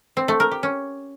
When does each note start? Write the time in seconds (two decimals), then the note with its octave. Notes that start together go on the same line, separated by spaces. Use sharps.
0.17 C4
0.28 A3
0.40 A#4
0.51 G4
0.63 C#4